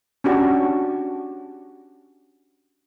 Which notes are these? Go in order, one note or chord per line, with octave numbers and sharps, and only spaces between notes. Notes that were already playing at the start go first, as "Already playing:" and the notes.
C#4 D4 F#4 G4